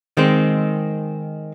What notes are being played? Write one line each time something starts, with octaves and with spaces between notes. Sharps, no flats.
D#3 G#3 C4